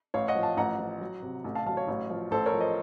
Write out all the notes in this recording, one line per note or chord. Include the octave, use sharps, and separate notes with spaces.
A1 C#5 F5
D#5 F#5
F3
F5 A5
A1 F#5 A#5
F3
F#3
C3
A1
F5 A5
F#3 F5 A5
C#5 F5
A1
F3
A1 A4 C5
A#4 C#5
F3
C5 D#5